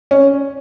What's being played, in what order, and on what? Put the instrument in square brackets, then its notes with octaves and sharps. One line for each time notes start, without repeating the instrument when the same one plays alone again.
[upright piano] C#4